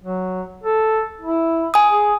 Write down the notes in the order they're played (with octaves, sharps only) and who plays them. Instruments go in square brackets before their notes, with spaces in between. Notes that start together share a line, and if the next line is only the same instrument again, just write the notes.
[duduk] F#3
A4
E4
[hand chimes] G#5 D#6
[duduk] G#4